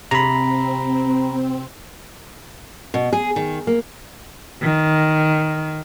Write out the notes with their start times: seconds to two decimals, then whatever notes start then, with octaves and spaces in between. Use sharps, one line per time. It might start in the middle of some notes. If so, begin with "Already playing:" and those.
0.11 C3 C4 A#5 B5
2.94 B2
3.13 G#4
3.36 D#3
3.67 A#3
4.62 D#3